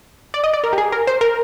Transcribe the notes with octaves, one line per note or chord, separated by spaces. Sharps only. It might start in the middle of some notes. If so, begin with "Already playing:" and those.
D5
D#5
D5
A#4
G4
G#4
A#4
C5
A#4